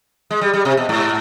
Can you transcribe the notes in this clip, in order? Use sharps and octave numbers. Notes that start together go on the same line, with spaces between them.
G#3
G3
G3
C3
B2
G#2